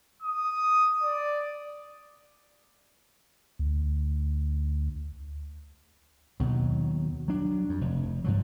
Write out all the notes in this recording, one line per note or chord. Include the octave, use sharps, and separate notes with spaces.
D#6
D5
D2
D#2 B2 D#3 F#3
F#3 D4
F2
F1
G2 F3 F#3